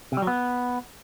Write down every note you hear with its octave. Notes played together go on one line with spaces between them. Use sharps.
C3
G3
F#3
B3